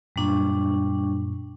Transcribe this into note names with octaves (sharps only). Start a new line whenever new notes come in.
F#2 A#2 G3 D4 C#6